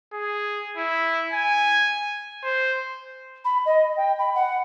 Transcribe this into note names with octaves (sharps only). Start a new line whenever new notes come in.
G#4
E4
G#5
C5
B5
D#5
G5
B5
F#5